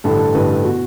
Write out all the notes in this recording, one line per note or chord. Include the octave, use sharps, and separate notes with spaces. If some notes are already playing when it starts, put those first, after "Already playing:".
A1 G2 D3 A4
A4
A1 G2 D3 B4
A4
B2 F#4